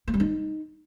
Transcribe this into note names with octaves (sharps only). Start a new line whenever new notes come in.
A#3
G3
D#4